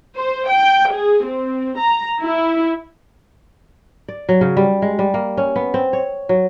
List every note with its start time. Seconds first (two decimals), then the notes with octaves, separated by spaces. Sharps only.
0.17 C5
0.50 G5
0.91 G#4
1.25 C4
1.78 A#5
2.21 E4
4.09 D5
4.29 F#3
4.41 C#3
4.57 G3
4.82 G#3
4.99 G3
5.14 A#3
5.37 C#4
5.56 B3
5.74 C4
5.93 C#5
6.29 F#3